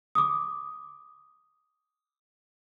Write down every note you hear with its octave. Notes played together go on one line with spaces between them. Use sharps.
D6 D#6